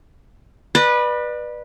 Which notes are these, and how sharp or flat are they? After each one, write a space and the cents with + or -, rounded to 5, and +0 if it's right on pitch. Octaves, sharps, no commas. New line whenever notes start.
B4 -15 D5 +35